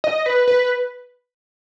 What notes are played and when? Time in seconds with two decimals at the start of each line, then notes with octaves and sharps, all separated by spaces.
0.04 D#5
0.26 B4
0.48 B4